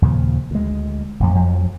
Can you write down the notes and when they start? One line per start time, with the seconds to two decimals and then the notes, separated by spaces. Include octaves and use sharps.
0.02 D#2 A#2 C#3 F3
0.51 D2 G#3
1.20 A1 F2
1.35 F2 F3 F#3